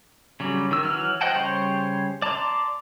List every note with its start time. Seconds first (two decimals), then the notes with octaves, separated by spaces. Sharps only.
0.40 C#3 F#3 G3
0.71 D#3 E6
0.84 E3 F#3 F6
1.21 C5 D#5 F#5 G5 A5
1.35 C#3 G3 C5 C#5 G5
2.22 D5 A5 A#5 C6 D6